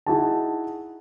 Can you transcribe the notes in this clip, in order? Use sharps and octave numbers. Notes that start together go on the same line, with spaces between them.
D#4 E4 F#4 G#4 A5